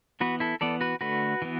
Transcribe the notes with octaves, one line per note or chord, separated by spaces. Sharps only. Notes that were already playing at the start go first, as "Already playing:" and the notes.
E3 B3 F#4 B4
E4 A4
E3 B3 A4 D5
F#4 B4
D3 A3 F#4 B4
E3 B3